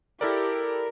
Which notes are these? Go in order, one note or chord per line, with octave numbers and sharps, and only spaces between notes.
E4 G4 A4 A#4 D5